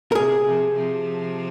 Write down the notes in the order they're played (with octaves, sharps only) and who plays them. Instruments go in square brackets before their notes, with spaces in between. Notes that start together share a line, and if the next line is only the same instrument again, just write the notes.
[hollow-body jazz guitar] A#4
[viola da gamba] C3 [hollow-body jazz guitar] G#4
[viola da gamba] C3 F3
C3 F3